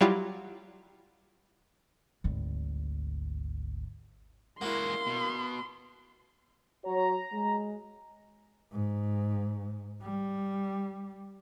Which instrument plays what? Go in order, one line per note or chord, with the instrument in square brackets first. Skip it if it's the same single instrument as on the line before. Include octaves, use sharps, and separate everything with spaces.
[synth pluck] F#3 G3 E4 F4 G4
[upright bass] G#1 D2
[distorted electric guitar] G#3 F#4 [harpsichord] A#3 E4 [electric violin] C6
[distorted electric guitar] B2
[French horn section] F#3 F#4 C#5 [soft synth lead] A#5
[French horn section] G#3
[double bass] G#2
G3